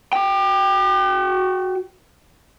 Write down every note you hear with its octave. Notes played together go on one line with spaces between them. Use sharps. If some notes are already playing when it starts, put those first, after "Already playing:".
F#4 G5